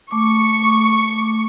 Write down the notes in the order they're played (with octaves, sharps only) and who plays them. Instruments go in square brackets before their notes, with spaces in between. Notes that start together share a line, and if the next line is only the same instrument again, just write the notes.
[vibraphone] A3 D6 [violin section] C#6